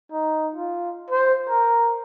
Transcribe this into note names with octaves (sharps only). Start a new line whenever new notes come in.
D#4
F4
C5
A#4